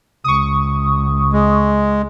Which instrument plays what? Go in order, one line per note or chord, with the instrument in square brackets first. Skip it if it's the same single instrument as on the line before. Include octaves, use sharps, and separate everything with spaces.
[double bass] C#2 [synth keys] C#6 D#6
[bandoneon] G#3